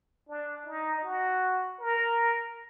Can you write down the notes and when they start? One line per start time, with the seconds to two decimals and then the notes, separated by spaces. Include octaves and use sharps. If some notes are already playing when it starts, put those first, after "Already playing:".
0.29 D4
0.67 D#4
1.04 F#4
1.80 A#4